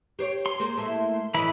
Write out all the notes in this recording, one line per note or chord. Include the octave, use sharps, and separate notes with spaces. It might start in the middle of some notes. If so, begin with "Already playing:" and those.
G4 C5 C#5
C6
A#3 G#4 C5
A3 A#3 E4
A2 E3 E4 D#5 B5